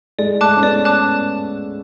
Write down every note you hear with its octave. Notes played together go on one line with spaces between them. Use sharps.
G#3 D5
A3 A5 D6 F#6
C#4
B3 D5
A5 D6 F#6